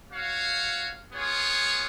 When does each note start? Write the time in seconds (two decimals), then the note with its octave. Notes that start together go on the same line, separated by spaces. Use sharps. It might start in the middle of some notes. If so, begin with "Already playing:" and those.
0.11 F#4 C#5 F5
1.13 B3 F4 G#4 C#5